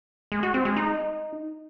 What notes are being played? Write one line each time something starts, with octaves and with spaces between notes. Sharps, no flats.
G#3
F#4
C4
G#3
D#4